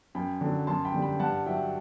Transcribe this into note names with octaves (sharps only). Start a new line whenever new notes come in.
F#2 G5 B5
D3 F#3
F#2 A5 C6
G5 B5
D3 G3
G5 B5
G2 F#5 A5
F#3 E5 G5